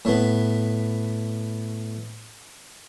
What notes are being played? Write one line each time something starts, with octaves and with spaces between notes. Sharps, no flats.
A2 B3